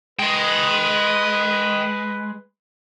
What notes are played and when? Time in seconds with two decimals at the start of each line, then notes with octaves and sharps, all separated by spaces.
0.19 G#3 B4 D#5 G5